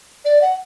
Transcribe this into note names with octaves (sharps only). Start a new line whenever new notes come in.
D5
F#5